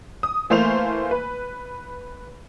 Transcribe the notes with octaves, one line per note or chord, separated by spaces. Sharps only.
D#6
E3 A3 A#3 C5 F5 F7
B4